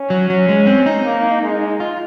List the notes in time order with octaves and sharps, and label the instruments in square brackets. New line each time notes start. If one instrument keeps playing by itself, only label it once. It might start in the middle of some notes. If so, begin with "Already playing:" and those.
Already playing: [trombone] C#4
[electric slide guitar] F#3
F#3
G#3
C4
D#4
[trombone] A#3
G#3
[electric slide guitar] F4